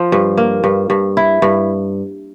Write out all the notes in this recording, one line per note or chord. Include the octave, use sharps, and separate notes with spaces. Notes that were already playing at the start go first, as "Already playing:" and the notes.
Already playing: F3
G2
A#3
G2
G2
E4
G2